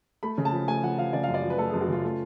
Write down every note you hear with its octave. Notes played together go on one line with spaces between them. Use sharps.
A3 B5
C#3
A5
F3
A3 G#5
F3 F#5
F3 F5
C#3 D5
F#2 F5
D5
F3
B4
A3 A4
F#2 G#4
F#4
C#3 F4
A3